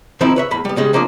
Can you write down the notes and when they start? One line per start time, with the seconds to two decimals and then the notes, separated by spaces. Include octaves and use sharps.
0.21 D#3 F3 C4 D#4 E4
0.36 B4 C#5 E5
0.51 E2 A2 B5
0.65 G3 B3
0.76 C#3 G3 G#3 C#4
0.93 F3 A#3 C#4 D4 F4